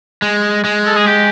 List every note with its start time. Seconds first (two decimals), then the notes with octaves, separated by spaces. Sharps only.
0.22 G#3
0.64 G#3
0.86 A4
0.96 G#4
1.06 G4